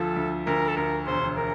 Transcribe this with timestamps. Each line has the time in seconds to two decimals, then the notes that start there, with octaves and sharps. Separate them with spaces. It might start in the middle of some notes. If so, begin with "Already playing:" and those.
Already playing: D2 F3 A4
0.16 D2
0.46 D2 A#4
0.68 A4
0.76 D2 A#4
1.07 E1 C5
1.37 A#4